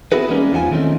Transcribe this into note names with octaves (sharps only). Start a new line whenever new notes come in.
B3 C4 E4 F#4 G#4 B4
E3 G3 G#3 A#3 C#4 D#4
E2 F3 F4 F#5 G#5
D#3 E3 A3 C4 C#4 D#4